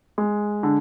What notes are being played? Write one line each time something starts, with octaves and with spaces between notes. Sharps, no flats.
G#3
D3